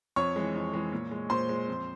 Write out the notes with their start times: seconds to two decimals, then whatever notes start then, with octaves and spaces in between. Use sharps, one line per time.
0.16 F2 C#5 C#6
0.36 E3 G#3
0.54 F2
0.73 E3 G#3
0.92 A#2
1.11 G#3
1.30 A#2 C5 C6
1.49 G#3
1.68 F2